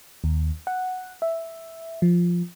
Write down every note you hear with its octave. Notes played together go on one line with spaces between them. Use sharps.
D#2
F#5
E5
F3